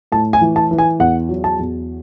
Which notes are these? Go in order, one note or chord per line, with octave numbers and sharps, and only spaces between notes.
A2 A5
G#5
E3
A5
E3
G#5
E2 F#5
F#3
A5
E2